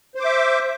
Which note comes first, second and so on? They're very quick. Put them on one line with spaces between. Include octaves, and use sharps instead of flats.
C5 D6 E5